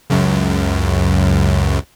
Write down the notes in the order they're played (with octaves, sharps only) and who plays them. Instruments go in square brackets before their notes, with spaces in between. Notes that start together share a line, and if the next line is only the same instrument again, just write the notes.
[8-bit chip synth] C#2 F#2